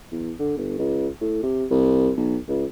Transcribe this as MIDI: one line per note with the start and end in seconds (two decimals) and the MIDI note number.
0.11 0.33 40
0.39 0.56 50
0.57 0.75 31
0.78 1.07 37
1.21 1.38 45
1.43 1.65 48
1.70 2.10 36
2.17 2.37 35
2.48 2.65 37